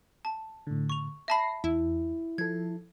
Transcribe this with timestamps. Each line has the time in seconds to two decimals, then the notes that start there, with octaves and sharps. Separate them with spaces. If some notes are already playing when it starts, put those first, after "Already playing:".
0.25 A5
0.67 A2 D3
0.90 C#6 F7
1.28 E5 A5 B5 A#6 C7
1.64 E2 E4
2.38 F3 A4 G#6